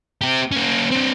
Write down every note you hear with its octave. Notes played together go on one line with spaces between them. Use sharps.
C4 G4
A#3 C#4
C4 D4